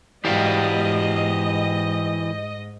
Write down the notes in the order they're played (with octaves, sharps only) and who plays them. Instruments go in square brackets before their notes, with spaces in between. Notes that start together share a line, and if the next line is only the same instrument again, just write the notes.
[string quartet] G#2 [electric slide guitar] E3 F#4 [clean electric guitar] G4 D5 F5 [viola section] D#5